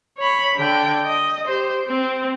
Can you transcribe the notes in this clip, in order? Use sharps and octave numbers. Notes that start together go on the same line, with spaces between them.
C#5 B5
D3 G5
D#5
G4 C5
C4